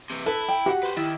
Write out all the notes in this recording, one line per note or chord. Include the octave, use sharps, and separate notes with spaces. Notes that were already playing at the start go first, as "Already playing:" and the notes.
C3 E3
E4 A4 B4
G5
F#4 G4 F#5
B4 C5
D#3 E4